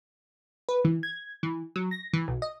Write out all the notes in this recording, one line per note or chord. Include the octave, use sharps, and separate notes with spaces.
B4
E3
G#6
E3
F#3
A#6
E3
B1
D#5